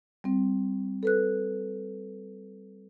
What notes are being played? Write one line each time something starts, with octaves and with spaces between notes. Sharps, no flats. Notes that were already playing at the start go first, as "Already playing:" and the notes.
G3 C4
A4 B4 F#6